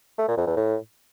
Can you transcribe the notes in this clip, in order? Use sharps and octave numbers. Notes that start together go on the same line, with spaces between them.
A3
A#2
F2
E2
A2